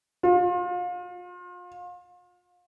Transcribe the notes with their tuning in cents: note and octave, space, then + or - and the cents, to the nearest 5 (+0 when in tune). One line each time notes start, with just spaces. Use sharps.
F4 +35